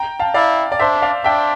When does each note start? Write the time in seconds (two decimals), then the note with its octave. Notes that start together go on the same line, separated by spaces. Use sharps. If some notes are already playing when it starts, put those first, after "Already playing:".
Already playing: G5 A#5
0.20 F5 A5
0.34 E4 D5 F5
0.72 D5
0.79 D4 C5 E5
1.02 D5 F5
1.24 D4 E5 G5